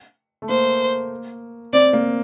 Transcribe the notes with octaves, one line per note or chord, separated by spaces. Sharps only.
A3
A#3 C5
C4 D5
A#3